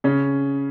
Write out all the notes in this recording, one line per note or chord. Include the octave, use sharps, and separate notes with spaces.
C#3 C#4